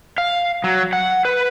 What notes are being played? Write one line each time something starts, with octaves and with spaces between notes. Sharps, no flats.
F5
F#3
F#5
B4